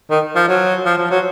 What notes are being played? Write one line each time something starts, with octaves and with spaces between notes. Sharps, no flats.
D#3
F3
F#3
F3
F3
F#3